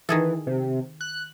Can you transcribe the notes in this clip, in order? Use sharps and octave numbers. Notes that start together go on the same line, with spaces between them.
D#3 E3 G#4 A4
C3
F#6